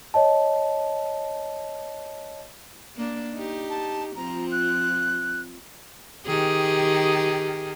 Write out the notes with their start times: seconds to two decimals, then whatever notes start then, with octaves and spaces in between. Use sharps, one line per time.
0.14 C#5 D#5 A5
2.97 A#3 D4
3.34 D#4 G4
3.70 A5
4.16 F3 C4 F4 A#5
4.52 F#6
6.27 D#3 G4 G#4